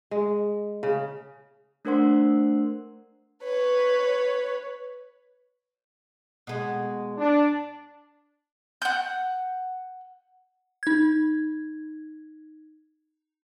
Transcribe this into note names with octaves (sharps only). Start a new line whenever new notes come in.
G#3
C#3
A3 D4 A#4 C5 F#5 C6
B4 C#5
B2 G#3
D4
F#5 G6
D#4 G#6